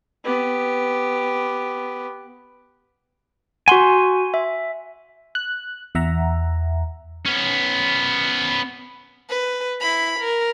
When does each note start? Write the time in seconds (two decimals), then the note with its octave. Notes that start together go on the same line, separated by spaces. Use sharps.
0.25 B3 G4
3.68 F#4 F#5 G#5 C6
4.34 E5
5.35 F#6
5.95 E2 E5 F#5 A#5
7.26 B3 C#4
9.29 B4
9.81 E4 B5
10.19 A#4